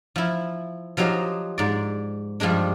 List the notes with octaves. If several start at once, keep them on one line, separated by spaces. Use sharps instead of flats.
F3 E4
F3 F#3 D#4 G4 C5 D#5
G#2 D5
G2 F3 G3 G#3 D4